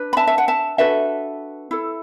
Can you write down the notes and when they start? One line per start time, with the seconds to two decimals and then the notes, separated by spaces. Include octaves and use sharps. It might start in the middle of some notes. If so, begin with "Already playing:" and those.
Already playing: D4 B4
0.13 B5
0.17 E5 A5
0.27 E5
0.38 F#5
0.48 E5 A5
0.78 D4 F#4 A4 B4 E5
1.71 E4 A4